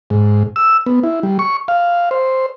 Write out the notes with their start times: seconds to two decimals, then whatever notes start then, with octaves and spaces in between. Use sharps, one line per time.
0.10 G#2
0.56 E6
0.86 B3
1.03 E4
1.23 G3
1.39 C#6
1.68 F5
2.11 C5